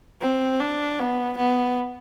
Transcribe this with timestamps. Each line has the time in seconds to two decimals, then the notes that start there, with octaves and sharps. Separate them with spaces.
0.21 C4
0.60 D4
0.99 B3
1.37 B3